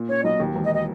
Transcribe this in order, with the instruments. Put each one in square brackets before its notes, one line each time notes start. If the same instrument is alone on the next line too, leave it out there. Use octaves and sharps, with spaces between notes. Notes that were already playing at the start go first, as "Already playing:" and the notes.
Already playing: [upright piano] A#2
[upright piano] C#4 [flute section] C#5
[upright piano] B1 [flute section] D#5
[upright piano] D#2
E1
[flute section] D#5
D#5